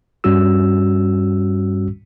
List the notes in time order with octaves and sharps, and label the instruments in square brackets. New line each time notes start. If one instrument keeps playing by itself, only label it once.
[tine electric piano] G2 G3 C#4 F#4 E6